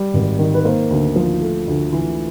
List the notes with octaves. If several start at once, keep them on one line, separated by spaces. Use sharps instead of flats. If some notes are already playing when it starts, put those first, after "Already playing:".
Already playing: G3
G#1
D#3
B4
A#3 C5
D2
F3
A3
D2
E3